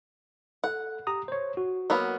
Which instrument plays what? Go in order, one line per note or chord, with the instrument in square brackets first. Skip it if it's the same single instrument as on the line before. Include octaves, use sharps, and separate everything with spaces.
[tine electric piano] A4 [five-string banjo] F#5
[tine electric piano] G4 A#5 D#6
C5 C#5
F#4
[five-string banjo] F#3 A#3 B3